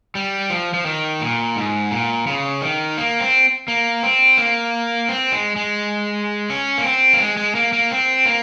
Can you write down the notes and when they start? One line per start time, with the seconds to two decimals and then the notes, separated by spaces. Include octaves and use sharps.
0.15 G3
0.50 F3
0.74 F3
0.86 D#3
1.21 A#2
1.56 G#2
1.91 A#2
2.27 C#3
2.62 D#3
2.98 A#3
3.20 C4
3.68 A#3
4.03 C4
4.38 A#3
5.09 C4
5.32 G#3
5.56 G#3
6.50 C#4
6.78 A#3
6.84 C4
7.13 A#3
7.20 G#3
7.37 G#3
7.55 A#3
7.73 A#3
7.91 C4
8.26 A#3